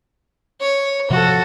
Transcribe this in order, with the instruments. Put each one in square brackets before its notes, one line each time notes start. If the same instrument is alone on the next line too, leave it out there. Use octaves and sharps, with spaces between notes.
[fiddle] C#5
[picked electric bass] C3 F3 [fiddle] F#4 A4